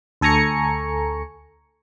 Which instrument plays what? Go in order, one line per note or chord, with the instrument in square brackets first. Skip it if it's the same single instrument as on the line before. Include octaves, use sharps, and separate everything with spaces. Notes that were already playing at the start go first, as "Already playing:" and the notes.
[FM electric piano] D2 A4 G#5 A#5 C#6 C#7